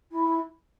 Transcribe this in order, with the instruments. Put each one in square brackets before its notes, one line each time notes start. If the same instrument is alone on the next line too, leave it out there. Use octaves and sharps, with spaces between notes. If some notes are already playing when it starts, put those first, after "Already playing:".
[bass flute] E4